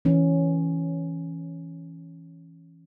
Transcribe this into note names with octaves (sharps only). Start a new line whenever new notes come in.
E3 C#4